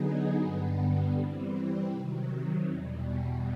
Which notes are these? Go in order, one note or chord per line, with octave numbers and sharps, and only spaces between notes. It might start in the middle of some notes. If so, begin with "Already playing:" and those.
Already playing: D3 F#3 B3 D#4 G#4
G2 D3 G3 B3
E3 G3 C4
C3 D#3 F#3
E2 B2 G3